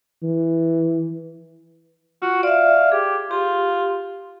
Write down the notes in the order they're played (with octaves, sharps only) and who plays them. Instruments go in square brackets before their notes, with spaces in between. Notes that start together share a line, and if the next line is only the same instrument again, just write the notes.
[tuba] E3
[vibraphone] F4 [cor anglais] F#4
[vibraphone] D5 E5 [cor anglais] F5
[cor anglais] G4 [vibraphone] G#4
[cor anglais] F4 [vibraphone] G4